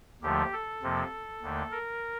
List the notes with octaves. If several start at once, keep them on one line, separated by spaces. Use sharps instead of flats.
D#2 D3 F3 A3 G4
A4
F2 C3 F3 A#3
D#2 D3 A3
A#4